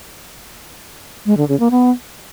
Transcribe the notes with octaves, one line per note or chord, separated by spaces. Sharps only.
G#3
D3
C#3
A#3
B3